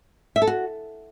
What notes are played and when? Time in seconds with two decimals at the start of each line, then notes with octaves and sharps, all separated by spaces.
0.36 E5
0.42 A4
0.47 F#4